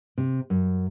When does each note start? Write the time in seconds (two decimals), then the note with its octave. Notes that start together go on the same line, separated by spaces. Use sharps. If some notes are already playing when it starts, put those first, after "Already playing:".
0.18 C3
0.50 F#2